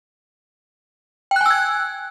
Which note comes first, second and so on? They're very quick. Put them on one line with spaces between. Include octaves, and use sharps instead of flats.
G5 F#6 G#5 E6 G#6